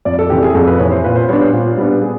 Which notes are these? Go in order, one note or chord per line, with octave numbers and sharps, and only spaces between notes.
F2 D5
A4
C3 E3 G4
G#4
F2 A4
B4
C3 E3 C#5
C5
A#2 B4
C5
G3 B3 D4 C#5
C5
A#2
G3 B3 D4
G#4